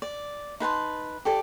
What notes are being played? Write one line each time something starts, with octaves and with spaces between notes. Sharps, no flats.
D5
D#4 B4 A5 C6
G4 A4 D5